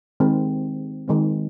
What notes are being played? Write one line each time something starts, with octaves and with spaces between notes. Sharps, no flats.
D#3 G#3 C4
D#3 G#3 C4